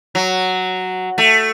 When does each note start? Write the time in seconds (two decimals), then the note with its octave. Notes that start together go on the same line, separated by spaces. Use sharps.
0.15 F#3
1.18 A3